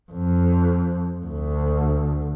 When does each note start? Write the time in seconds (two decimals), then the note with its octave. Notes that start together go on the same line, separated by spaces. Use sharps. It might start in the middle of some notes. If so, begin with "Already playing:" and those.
0.11 F2
1.26 D2